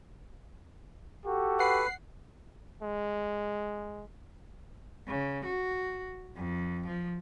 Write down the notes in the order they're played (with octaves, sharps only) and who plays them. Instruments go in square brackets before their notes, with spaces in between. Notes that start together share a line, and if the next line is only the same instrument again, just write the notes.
[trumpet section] F#4 G4 A4
[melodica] B4 [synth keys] F#5 C7
[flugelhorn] G#3
[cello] C#3
F#4
F2
F3